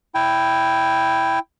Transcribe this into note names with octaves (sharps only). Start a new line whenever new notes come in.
E4 G5